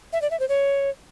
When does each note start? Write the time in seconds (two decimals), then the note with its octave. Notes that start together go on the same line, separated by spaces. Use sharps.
0.13 E5
0.22 D5
0.31 E5
0.40 C5
0.49 C#5